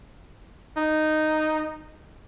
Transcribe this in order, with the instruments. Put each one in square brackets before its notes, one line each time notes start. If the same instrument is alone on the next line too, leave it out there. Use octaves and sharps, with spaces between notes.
[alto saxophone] D#4